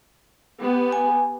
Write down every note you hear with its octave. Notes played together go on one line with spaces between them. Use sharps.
B3 G4
G#5